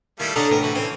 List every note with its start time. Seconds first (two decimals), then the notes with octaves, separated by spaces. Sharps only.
0.20 D#3 G3 A3 E4 F5
0.36 D3 D4 A4 C#5 D#5 A5 A#5
0.51 A2 E3 C4 A#4
0.63 D3 E3 F#4
0.75 E3 C4 C#4